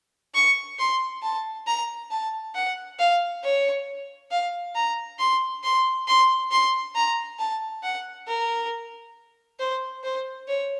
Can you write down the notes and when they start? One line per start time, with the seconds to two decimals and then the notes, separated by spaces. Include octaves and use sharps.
0.34 C#6
0.79 C6
1.23 A5
1.67 A#5
2.11 A5
2.55 F#5
2.99 F5
3.43 C#5
4.31 F5
4.75 A#5
5.19 C6
5.63 C6
6.07 C6
6.51 C6
6.95 A#5
7.39 A5
7.83 F#5
8.27 A#4
9.59 C5
10.03 C5
10.48 C#5